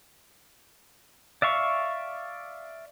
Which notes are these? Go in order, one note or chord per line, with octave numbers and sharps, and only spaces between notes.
D5 E5 F5 C#6